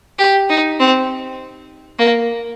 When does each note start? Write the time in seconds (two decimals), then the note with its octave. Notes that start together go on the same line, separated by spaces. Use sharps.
0.19 G4
0.50 D#4
0.80 C4
1.99 A#3